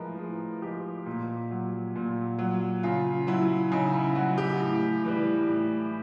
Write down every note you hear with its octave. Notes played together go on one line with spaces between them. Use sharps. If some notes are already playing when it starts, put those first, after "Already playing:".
Already playing: A2 F3 G#3 A#4 B4
A2 G#4
F3 G#3 G4
A#2
F#3
A#2
F#3
C#3 F4
F#3 E4
C#3 D#4
E4
F#3 F#4
G4
A2
E3 G3
A2